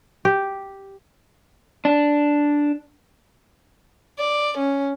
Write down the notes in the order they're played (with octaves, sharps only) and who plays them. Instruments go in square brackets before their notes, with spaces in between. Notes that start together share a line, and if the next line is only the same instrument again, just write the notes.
[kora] G4
[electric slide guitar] D4
[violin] D5
C#4